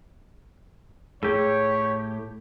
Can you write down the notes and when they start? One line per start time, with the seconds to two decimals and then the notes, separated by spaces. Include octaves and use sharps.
1.23 A2 G4 G#4 C#5